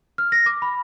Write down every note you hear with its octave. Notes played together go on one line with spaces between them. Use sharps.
F6
A#6
D6
B5